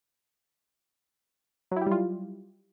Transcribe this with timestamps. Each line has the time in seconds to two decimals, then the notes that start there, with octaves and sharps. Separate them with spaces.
1.72 F#3
1.76 E4
1.81 G4
1.86 G3
1.91 F4